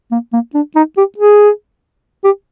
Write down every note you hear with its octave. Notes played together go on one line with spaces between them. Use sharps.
A#3
A#3
D4
D#4
G4
G#4
G4